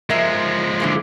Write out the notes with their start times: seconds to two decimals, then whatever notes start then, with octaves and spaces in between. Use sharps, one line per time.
0.10 F3 G#3 A#4 E5
0.80 D3 E3 A#3